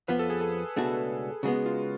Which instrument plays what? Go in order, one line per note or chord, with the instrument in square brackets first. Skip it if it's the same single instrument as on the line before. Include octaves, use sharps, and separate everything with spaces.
[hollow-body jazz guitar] F2 F3 B3 [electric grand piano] B4
[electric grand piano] A4
G#4
A4
[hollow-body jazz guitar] C#2 B2 A3 D4 F#4 [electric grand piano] G#4
[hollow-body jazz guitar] C#3 G#3 B3 [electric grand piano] F#4
[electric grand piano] F4